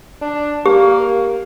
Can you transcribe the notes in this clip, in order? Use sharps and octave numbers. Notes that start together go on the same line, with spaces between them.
D4
A#3 G4